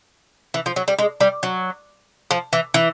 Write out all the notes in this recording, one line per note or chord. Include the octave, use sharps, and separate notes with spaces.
E3
F3
F#3
G3
G#3
G3
F#3
F3
E3
E3